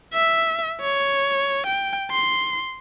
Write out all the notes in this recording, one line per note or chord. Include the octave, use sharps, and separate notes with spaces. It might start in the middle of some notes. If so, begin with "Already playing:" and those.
E5
C#5
G5
C6